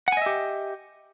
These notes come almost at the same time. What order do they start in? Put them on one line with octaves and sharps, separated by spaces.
F#5 G#5 D#5 E5 G4